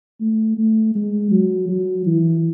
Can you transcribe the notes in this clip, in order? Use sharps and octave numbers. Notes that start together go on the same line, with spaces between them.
A3
A3
G#3
F#3
F#3
E3